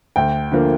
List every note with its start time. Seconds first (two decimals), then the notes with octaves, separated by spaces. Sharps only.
0.16 D2 G5
0.52 D3 F3 A#3